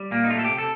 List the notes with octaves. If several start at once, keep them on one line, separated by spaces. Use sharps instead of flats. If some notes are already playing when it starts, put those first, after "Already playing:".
Already playing: G3
A#2 A#3
D#4
A3 F4
A4
C3 G4
A4